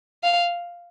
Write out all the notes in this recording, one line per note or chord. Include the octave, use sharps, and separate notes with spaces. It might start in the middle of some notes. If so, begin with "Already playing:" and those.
F5